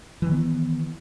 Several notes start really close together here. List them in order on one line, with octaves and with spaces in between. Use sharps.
E3 D#3 B3